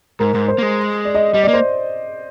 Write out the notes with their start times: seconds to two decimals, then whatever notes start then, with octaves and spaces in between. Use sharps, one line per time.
0.20 G#2 A#4
0.34 G#2
0.48 C5
0.58 A#3
0.62 G#3
1.05 D5
1.15 D#5
1.33 G3 D#5
1.43 D5
1.48 A#3
1.53 C5